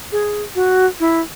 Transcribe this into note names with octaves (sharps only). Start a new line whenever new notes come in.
G#4
F#4
E4